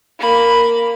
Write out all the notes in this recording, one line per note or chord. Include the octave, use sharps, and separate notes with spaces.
A#3 B5